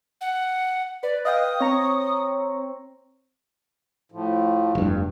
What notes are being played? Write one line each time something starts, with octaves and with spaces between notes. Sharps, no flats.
F#5
B4 D5
D#5 F5 G5 D#6
C4 C#5 A#5 C#6
A2 F3
F1 G2